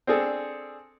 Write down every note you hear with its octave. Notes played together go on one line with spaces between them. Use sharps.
C4 D4 G#4 A4